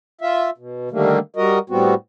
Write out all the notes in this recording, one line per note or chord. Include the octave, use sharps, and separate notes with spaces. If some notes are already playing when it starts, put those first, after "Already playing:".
F4 E5
B2
D3 D#3 G3 A3 A#3
G3 F#4 A#4 D#5
A2 G3 B3 C4 F#4